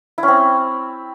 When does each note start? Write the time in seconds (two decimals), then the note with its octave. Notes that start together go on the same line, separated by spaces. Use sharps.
0.18 E4
0.23 C#4
0.28 C4